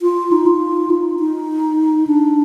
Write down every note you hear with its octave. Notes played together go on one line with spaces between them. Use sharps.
F4
D#4
F4
D#4
D#4
D4